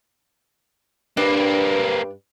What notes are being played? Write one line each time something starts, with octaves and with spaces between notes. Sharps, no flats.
G2 A#3 C4 D4 B4